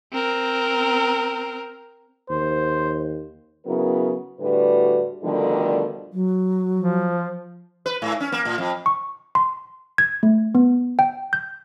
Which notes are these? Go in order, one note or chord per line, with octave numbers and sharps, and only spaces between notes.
C4 A#4
D#2 C5
C#3 F#3 B3 E4 A#4
A2 D3 G3 F#4 B4
B2 D3 D#3 F3 G3 A3
F#3
F3
B4
G#2
C#4
A#3
A2
F2
C#6
C6
G#6
A3
B3
G5
G6